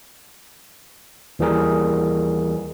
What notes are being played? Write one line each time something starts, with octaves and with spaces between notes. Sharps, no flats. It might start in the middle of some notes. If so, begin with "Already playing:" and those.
D#2 E3 G3 G#4 A#4